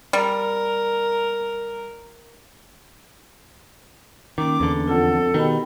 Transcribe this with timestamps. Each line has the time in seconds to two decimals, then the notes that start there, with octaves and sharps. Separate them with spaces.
0.13 G3 A#4
4.38 D#3 A#3 C#4 D6
4.60 E2 D3
4.87 F2 F4 A4 F#5
5.34 B2 D#3 G4 G5 B5